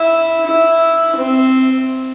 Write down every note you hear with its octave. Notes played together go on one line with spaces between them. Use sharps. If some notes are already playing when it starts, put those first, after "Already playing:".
Already playing: E4
E4
C4